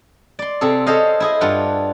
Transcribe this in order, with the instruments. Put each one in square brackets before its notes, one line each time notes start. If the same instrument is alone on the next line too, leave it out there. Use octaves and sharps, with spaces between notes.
[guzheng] D5 C6
C3 C4 G#4 A4
G#4 A4 C5 C#5 D#5 F5
E4 G#4 D#5
G2 D4 F4 F#5